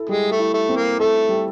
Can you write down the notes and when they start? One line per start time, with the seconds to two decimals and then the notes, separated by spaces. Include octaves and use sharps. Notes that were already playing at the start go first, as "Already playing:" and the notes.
Already playing: E4 A4
0.09 G3 G#3
0.32 A3
0.39 E4
0.54 A3
0.69 C4
0.77 A#3
0.99 A3 A4
1.29 G3